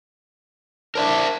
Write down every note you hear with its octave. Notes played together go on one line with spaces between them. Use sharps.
D4 A#4 C5 E5